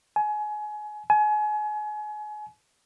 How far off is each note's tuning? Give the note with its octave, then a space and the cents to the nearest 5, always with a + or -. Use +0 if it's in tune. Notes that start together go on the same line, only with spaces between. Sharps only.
G#5 +25
G#5 +30